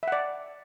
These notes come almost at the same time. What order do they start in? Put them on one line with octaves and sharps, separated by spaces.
E5 F#5 D5